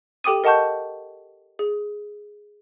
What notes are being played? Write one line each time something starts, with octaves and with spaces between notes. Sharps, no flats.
G4 A4 G5 D6 D#6 D#7
A#4 D#5 F#5 A5 C#6 G6
G#4